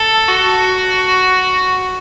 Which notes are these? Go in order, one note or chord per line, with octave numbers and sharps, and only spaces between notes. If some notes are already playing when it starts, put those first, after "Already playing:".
Already playing: A4
F#4